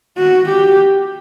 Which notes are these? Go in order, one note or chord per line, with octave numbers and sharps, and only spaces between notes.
F#4
G4